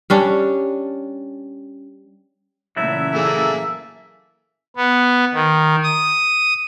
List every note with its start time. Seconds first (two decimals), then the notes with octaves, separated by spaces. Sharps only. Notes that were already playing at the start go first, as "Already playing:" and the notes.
0.10 G3 C#4 D4
2.77 A#2 C#3 E3 F#3 A3 E4 E5
3.15 A#3 G#4 A4
4.76 B3
5.33 D#3
5.83 D#6